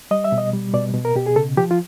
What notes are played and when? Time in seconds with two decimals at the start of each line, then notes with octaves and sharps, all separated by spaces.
0.11 G3 D#5
0.24 E5
0.32 B2
0.38 D#5
0.53 G3
0.74 B2 D5
0.94 B2
1.05 A#4
1.15 B2 G4
1.26 G#4
1.36 C#3 A4
1.57 F3 G4
1.71 F4